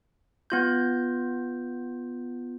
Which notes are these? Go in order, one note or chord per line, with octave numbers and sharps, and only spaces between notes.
B3 F4 G6